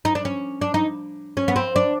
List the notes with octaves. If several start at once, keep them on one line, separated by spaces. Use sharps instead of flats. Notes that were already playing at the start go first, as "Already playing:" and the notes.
D#4
D4
C#4
D4
D#4
C#4
B3
C4
D4